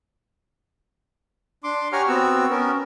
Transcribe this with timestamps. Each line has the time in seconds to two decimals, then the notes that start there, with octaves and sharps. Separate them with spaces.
1.64 D4 C6 D6
1.93 G4 C#5 F#5 G#5 A#5 F6
2.08 B3 C4 F#4 E6
2.50 B3 C#4 A#4